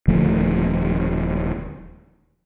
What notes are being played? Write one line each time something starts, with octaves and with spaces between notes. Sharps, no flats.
D#1 D3 F3 A3